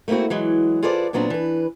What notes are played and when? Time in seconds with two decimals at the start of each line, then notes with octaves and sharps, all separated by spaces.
0.08 A3 A#3 C4 E4 F#4
0.30 E3 F#3 G#3
0.82 F4 G#4 A4 B4 C5 D5
1.13 A#2 F#3 B3 C4 D4
1.30 E3 B4